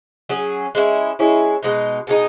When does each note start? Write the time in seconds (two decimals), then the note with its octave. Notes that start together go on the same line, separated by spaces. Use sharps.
0.29 F#3 C#4 G#4
0.75 G#3 C#4 E4
1.19 G#3 C#4 E4
1.63 B2 G#3 D#4
2.07 B2 G#3 D#4